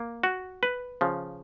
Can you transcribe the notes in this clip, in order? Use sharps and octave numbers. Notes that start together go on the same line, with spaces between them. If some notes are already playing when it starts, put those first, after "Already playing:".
Already playing: A#3
F#4
B4
C#3 F3